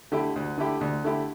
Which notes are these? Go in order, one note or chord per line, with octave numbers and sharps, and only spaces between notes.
D3 A3 E4 G4
D2
D3 A3 E4 G4
D2
D3 A3 E4 G4